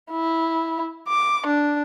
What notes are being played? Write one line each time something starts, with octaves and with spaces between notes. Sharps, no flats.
E4
D6
D4